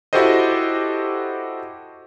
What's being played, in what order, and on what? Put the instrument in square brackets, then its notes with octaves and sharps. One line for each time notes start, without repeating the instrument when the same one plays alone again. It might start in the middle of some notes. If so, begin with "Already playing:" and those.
[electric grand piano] E4 F#4 G4 A4 C5 D#5